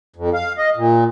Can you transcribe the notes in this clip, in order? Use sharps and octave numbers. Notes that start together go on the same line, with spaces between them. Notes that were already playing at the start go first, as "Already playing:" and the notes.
F2
F5
D#5
A#2